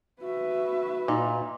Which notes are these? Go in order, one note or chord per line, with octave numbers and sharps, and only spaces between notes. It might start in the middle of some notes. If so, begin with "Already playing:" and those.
F#4 B4 E5
A#2 D#4